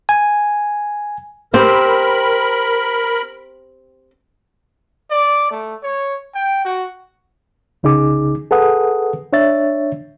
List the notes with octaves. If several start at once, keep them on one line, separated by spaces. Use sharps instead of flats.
G#5
C4 G4 A#4 B5
D5
A3
C#5
G5
F#4
C2 C#3 D#4 G#4 D6
G#4 A4 B4 F#5 D#6
D4 C#5 E5 A6